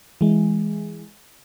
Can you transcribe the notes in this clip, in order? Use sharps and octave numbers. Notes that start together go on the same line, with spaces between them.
E3 G#3